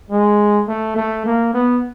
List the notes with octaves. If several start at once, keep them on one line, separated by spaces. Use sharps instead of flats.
G#3
A3
A3
A#3
B3